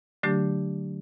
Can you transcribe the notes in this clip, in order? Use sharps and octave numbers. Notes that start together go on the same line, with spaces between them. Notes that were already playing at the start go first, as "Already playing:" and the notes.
D3 F#3 A3 D4 G4